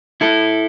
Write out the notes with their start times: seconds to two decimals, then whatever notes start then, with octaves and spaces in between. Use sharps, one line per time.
0.21 E4 A4